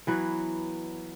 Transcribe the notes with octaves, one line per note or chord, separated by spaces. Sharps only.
E3 F#3 B3